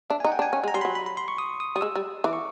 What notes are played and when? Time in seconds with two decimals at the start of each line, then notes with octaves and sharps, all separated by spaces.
0.10 D4 E5
0.20 G#5
0.24 D#4 F#5
0.32 G5
0.39 D4
0.42 G#5
0.53 C#4
0.64 G#3
0.68 A#5
0.74 G3 C6
0.81 B5
0.85 F#3
0.95 B5
1.06 B5
1.17 C6
1.28 C#6
1.38 D#6
1.60 D#6
1.76 G3 D#6
1.81 G#3 E6
1.96 G3
2.24 E3 D6
2.33 C#6